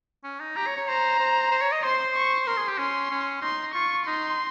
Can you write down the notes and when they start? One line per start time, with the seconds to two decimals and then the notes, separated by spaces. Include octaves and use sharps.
0.24 C#4
0.40 D#4
0.56 G4 A#5
0.67 C#5
0.77 C#5
0.88 C5 A#5
1.20 C5
1.51 C5
1.62 C#5
1.72 D#5
1.83 C5 C6
2.16 C#6
2.46 A#4 C6
2.57 G#4
2.68 G4
2.78 C#4 C6
3.11 C#4
3.42 D#4 C6
3.74 F4 C#6
4.06 D#4 C6